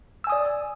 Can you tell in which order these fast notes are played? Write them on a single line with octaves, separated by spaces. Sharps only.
E6 G#5 D#6 D5